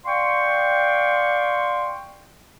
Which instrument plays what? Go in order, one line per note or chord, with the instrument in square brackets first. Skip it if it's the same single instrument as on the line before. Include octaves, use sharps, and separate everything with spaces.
[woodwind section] D5 F5 G5 C6 C#6